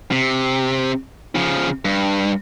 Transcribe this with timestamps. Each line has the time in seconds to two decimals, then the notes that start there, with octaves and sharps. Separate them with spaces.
0.12 C3
1.35 C#3 F3
1.85 G2